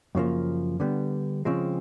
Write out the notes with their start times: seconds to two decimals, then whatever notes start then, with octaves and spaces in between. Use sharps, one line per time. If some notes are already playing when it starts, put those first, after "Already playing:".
0.15 F#2 C#3 F3 A#3
0.80 D3 G3 B3
1.45 C#3 F3 G#3 C4